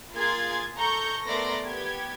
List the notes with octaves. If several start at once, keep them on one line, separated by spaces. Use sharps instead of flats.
A#3 F4 G#4 C6 G#6 A6
A4 A#5 C#6 G6
A3 B3 A#4 D5 C6 A#6
B3 G4 G#6